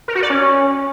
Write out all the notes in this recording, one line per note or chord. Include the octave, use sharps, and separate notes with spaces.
A#4
F#4
D5
C#4